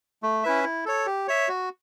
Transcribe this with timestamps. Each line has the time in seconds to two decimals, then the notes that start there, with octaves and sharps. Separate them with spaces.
0.23 A3
0.44 C#4 E4 B4 E5
0.64 E4
0.86 A4 C#5
1.06 G4
1.28 C#5 E5
1.48 F#4